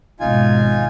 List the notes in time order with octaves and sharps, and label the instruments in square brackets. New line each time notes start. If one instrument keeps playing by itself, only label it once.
[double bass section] G#1 B2 [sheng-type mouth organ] D#4 F4 G#5